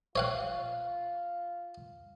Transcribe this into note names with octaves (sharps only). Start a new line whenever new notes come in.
F4 C#5 F5 F#5